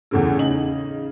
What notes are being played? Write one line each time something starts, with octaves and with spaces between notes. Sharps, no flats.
E2 A2 C#3
C#3 D#4 F#7